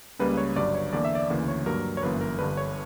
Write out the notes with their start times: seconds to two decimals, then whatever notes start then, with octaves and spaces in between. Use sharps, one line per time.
0.19 C#2 C#3 G3 A#3 B4
0.37 C#5
0.55 G1 G2 F#3 D5
0.75 C#5
0.93 E2 D3 A#3 D5
1.05 E5
1.15 D5
1.30 D2 C#3 E3 A#3
1.48 C#5
1.66 G2 F#3 A#3 A#4
1.97 C#5
2.02 G1 F#2 E3 A#3 B4
2.21 A#4
2.34 A#4
2.39 G1 G2 D3 B4
2.57 C#5